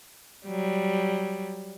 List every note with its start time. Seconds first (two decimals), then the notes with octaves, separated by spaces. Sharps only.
0.47 F#3 G3